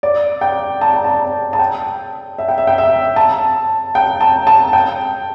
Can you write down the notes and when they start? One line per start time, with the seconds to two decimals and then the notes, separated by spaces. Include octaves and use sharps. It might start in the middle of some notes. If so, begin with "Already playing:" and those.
0.03 D5
0.41 G5
0.81 A5
0.93 G5
1.04 A5
1.53 A5
1.59 G5
2.38 E5
2.48 G5
2.58 E5
2.67 G5
2.78 E5
3.16 A5
3.95 G5
4.21 A5
4.47 A5
4.73 G5